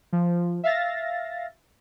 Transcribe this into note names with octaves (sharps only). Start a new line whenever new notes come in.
F3
E5 F5 A6 A#6